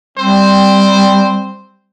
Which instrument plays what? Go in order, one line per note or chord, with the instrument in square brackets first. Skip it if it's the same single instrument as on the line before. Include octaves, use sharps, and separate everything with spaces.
[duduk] G3 [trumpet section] C4 C5